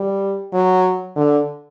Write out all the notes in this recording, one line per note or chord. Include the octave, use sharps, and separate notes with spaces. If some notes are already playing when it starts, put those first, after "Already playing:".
Already playing: G3
F#3
D3